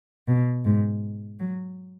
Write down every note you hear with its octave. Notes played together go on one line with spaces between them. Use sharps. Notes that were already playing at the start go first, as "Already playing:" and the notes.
B2
G#2
F#3